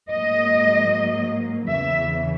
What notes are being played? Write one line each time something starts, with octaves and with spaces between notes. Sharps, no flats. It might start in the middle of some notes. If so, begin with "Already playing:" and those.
G#2 F#3 A#3 D#5
E2 C#3 E3 E5